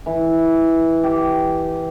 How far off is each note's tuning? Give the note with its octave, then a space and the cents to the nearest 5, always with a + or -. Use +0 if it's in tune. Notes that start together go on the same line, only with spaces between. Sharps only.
E3 -10
G4 -15